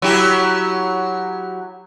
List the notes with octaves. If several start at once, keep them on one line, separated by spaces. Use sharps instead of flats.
F#3 E4 G4